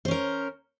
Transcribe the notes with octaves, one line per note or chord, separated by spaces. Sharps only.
C#4 A#4 C5